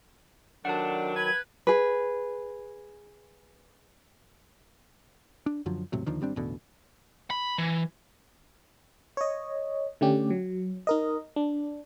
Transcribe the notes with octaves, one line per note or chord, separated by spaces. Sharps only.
C3 D#3 F#3 A3 D4 F#5 A5
B4 G#6
G#4 B4
D4
F#2 D3 F3 F#3
E1 A2 C3 F#3
D#2 D3 D#3 F3
G#1 G3 C4 D4
A1 E2 B2 D3
B5
E3
C#5 D#5
D3 A3 C#4 D4 G4
F#3
D#4 A#4 D#5
D4